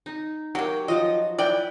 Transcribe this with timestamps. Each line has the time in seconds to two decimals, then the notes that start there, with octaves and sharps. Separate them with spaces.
0.06 D#4
0.55 F#3 A#3 G4 G5
0.88 F3 F#3 D#5
1.38 E4 B4 D5 G5